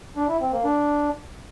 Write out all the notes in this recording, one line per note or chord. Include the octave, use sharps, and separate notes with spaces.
D4
E4
C4
A#3
D4